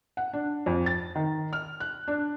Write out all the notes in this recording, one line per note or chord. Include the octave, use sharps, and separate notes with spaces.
F#5
D4
F2
A6
D#3
F6
F#6
D4